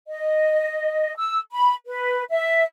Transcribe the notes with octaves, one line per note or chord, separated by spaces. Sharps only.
D#5
E6
B5
B4
E5